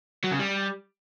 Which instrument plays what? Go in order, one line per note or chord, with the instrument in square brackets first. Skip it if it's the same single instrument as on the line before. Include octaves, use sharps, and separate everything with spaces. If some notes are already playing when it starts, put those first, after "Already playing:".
[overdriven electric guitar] F#3
C#3
G3